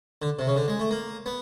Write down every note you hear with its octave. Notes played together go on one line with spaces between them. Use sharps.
D3
C3
C#3
D3
G#3
A3
A#3
B3